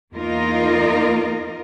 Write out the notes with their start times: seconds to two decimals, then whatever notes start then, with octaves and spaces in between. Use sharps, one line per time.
0.14 E2 A#3 D#4 F4 A#4 D#5